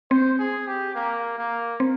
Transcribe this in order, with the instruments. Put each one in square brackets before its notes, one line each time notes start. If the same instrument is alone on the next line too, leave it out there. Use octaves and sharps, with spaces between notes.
[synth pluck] C4 [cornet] C5
[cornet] G#4
G4
A#3
A#3
[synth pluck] C4